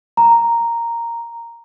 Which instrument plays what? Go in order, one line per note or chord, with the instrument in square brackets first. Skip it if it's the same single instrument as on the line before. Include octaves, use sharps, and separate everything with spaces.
[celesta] A#5